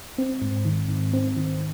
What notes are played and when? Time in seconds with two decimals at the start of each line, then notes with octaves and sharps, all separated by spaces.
0.18 C4
0.42 G#2
0.65 D#3
0.89 G#2
1.13 C4
1.37 D#3